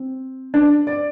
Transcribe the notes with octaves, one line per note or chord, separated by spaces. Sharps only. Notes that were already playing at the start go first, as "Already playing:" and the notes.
Already playing: C4
D4
D5